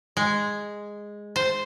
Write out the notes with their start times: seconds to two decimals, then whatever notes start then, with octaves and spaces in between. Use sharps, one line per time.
0.17 G#3
1.36 C5